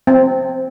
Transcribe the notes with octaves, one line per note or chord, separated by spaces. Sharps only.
C4